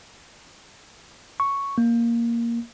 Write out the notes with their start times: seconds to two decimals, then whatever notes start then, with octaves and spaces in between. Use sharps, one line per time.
1.40 C#6
1.78 A#3